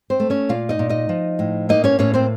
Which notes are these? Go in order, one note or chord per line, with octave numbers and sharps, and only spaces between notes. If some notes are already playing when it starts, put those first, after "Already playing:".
C4 C5
A3
C#4 C#5
A#2 F4 F5
D#4 D#5
A#2
D#4 D#5
F3
A2
A#3 D#4 D#5
C#4 C#5
A2 C#4 C#5
C4 C5